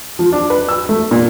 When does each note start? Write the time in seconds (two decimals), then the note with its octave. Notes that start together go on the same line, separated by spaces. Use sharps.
0.19 F3
0.33 D4
0.50 B4
0.69 E6
0.89 A3
1.11 A#2